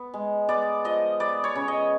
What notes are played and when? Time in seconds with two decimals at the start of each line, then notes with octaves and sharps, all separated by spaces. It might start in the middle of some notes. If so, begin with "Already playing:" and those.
Already playing: B3
0.14 G#3
0.49 B3 D5
0.85 F3 D#5
1.20 B3 D5
1.44 C#5
1.56 C#3
1.68 D#5